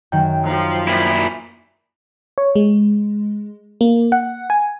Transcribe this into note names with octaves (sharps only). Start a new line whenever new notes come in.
F#2 D#3 F#5 G5
F3 A#5
A#2 E4
C#5
G#3
A#3
F#5
G#5